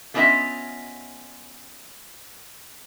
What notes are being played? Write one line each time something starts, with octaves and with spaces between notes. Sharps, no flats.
A3 B3 C#4 F4 D#5 E5